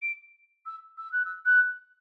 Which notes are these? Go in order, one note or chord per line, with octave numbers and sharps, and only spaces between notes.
D7
E6
E6
F#6
E6
F#6